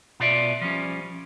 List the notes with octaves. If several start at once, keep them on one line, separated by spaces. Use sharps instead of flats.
B2 B3 F4 D5 E5
F3 G3 C#4